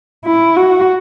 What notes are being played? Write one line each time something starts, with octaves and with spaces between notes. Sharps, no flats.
E4
F#4